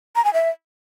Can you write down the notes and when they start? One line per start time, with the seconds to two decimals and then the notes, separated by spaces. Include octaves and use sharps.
0.16 A#5
0.25 G#5
0.34 E5